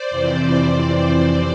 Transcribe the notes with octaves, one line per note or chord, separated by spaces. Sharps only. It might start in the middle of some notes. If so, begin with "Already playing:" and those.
Already playing: C5 D5
F2 C3 E3